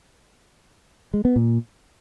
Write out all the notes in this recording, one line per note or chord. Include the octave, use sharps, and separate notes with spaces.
G#3
B3
A#2